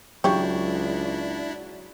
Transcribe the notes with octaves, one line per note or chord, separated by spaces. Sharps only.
C#2 C#3 F#3 D4 E4 G4 C#5